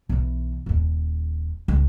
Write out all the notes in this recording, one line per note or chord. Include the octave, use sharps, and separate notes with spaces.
B1 E3
D#1 D#2
C#2